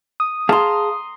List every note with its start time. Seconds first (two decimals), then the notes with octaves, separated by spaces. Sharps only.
0.20 D#6
0.49 G#4 F5 A5 A#5 C6